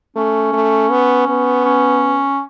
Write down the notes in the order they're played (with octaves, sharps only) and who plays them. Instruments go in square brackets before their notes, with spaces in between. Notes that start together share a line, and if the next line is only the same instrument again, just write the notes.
[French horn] A3 [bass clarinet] C#4
[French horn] A3
B3
B3
[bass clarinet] C#4